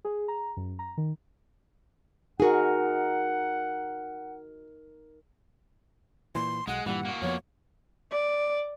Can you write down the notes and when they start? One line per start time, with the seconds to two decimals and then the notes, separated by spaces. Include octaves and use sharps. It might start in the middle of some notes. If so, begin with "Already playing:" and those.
0.05 G#4
0.28 A#5
0.57 F#2
0.79 A#5
0.97 D#3
2.40 D#4 F#4 G#4 A#4 F#5
6.35 A#2 E3 C6
6.67 B1 G#3 F#5
6.86 G2 A#2 E3 G3 F#5
7.05 A#3 F#4
7.22 F2 F3 B3 C#5
8.12 D5